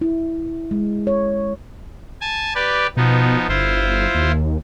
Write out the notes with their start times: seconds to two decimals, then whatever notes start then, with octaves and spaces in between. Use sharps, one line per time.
0.01 E4
0.71 G#3
1.07 C#5
2.21 G#5 A5
2.55 G4 B4 D5
2.97 B2 F3 B3 D#4
3.48 G1 E4 F4 C5
4.15 D#2